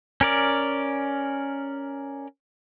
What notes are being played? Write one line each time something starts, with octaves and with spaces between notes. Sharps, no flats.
C#4 A#4 D5